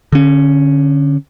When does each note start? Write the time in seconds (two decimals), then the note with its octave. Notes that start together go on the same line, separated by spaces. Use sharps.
0.12 D3 C#4